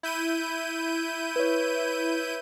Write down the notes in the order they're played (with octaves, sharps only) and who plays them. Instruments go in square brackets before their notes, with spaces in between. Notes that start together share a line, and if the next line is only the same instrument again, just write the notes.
[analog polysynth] E4 G6 D#7
[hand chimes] B4 C#5